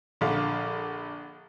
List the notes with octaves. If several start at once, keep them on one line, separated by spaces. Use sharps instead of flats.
A#1 D3 F5 F#5